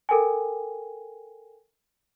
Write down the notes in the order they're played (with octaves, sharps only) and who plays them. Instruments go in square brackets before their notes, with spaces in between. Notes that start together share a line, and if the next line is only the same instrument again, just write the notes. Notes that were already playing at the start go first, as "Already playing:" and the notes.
[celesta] A4 A#4 G5 G#5